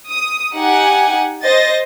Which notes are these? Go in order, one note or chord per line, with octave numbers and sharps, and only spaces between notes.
D#6
D#4 G4 F#5 G#5
C5 D#5 A6 A#6